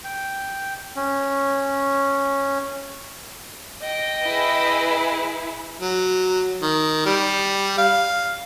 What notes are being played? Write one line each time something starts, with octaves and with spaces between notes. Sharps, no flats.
G5
C#4
D#5 G5
E4 G#4 B4
F#3
D#3
G3
F5